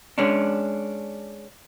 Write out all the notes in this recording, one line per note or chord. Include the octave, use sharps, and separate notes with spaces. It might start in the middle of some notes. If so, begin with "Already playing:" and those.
G#3 C#4 D4